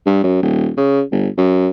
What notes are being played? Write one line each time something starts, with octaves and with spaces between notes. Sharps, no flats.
G2
F#2
D#1
C#3
G1
F#2